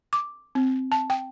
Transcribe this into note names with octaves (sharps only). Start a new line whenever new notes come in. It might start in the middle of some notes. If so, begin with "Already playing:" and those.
D6
C4
A5
G5